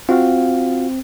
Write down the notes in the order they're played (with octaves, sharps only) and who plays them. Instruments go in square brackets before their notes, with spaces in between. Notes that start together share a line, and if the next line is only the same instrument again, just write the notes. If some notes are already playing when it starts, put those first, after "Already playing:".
[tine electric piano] C4 [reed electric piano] F4 F#4 F5